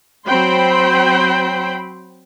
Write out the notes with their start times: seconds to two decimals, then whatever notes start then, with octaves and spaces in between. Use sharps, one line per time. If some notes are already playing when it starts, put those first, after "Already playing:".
0.26 F#3 C4 C5 G5 B5 C6